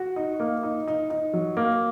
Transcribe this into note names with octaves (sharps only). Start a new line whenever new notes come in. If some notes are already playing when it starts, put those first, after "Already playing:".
Already playing: F#4
D#4
A#3
D#4
D#4
D#4
F#3
A#3